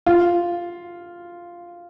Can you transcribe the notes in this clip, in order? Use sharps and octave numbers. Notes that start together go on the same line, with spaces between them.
F4